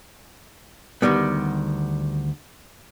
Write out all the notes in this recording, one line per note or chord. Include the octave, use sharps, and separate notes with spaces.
D2 D#3 G3 B3